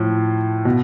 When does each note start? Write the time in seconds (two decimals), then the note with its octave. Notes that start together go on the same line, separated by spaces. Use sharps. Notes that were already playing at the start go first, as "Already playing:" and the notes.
Already playing: A2 F3
0.65 B2